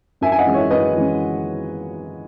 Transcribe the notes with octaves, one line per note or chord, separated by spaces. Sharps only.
F#2 E5 G#5
G#5
D#5 F#5
E3 G#3 C#4
C#5 E5
F#2 B4 D#5
E3 G#3 C#4